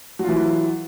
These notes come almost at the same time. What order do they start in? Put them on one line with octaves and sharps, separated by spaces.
F#3 F4 E3